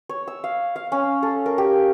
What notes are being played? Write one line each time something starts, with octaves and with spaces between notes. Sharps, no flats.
C#5
E6
F5
F5
C#4
A4
A#4
G4